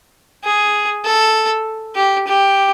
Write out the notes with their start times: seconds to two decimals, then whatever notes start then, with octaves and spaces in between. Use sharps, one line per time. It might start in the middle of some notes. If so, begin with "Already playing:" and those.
0.44 G#4
1.05 A4
1.96 G4
2.27 G4